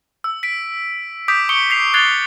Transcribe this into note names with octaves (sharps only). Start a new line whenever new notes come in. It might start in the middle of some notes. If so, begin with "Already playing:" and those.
E6
B6 D7
D6 D#6 G6 B6 D7
C#6 D#6 C#7 D7 G7
B6 C7 F7
F#6 G#6 A6 C7 F7 G7